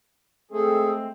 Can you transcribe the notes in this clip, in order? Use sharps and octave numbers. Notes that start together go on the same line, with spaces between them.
G#3 A3 C4 G#4 A4